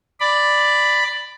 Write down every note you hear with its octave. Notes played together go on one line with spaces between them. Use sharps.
D5 B5